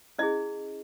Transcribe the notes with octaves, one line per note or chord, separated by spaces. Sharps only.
C#4 E4 G#4 D#5